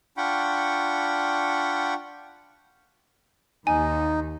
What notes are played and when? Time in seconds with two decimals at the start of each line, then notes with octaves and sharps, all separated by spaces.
0.17 D4 F4 F#5 G5 B5 C#6
3.67 D#2 D#4 G#5